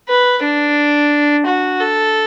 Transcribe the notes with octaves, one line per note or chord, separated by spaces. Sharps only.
B4
D4
F#4
A4